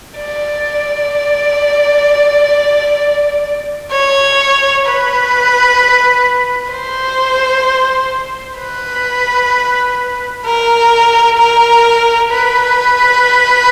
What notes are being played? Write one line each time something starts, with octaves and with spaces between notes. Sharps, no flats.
D5
C#5
B4
C5
B4
A#4
A#4
B4